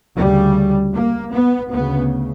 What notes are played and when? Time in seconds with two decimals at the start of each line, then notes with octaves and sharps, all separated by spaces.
0.17 D2 C#3 G3
0.94 A#3
1.33 B3
1.71 D2 C#3 B3